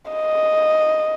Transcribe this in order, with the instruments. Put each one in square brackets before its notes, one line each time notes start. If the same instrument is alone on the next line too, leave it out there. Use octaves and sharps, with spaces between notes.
[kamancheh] D#5